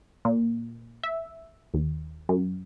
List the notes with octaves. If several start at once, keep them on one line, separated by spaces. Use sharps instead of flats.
A#2
E5
D#2
F#2